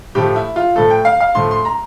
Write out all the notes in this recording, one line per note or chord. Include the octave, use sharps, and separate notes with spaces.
A2 F3 A3 G4
E4
F4
A2 F3 A3 A4
G5
F5
F5
A2 F3 A3 C6
C6
A#5